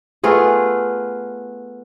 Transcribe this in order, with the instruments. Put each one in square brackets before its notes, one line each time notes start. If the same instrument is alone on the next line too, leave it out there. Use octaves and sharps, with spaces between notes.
[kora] A3 B3 F4 G#4